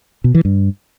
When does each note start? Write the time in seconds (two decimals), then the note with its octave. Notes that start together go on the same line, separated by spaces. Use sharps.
0.24 B2
0.35 E3
0.45 G2